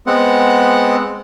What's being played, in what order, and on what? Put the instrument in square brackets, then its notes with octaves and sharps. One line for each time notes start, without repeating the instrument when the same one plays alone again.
[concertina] G#3 B3 C4 F#5